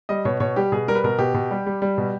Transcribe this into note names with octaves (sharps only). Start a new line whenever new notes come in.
G3 D#5
B2 C#5
B2 C#5
G3 G4
B2 G#4
G3 A#4
B4
B2 A#4
B2 G4
B2
G3
G3
G3
B2